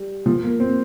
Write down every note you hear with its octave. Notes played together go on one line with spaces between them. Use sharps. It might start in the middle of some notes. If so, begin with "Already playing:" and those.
Already playing: G3
F3
A#3
C4